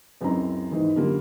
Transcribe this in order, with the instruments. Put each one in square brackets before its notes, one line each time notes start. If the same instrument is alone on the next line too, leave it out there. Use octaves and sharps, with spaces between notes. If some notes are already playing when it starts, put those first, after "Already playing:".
[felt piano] C#2 F#2 C4 E4 A#5
D#2 G#2 E3
F#2 D3 G3 A#3 F4